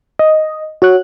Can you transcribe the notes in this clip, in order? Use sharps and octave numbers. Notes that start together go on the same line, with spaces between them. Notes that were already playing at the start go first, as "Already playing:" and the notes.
D#5
F#4 C#5 F#6